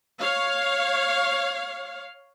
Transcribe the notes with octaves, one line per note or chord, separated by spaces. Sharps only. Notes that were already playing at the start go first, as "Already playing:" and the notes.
C#5 F5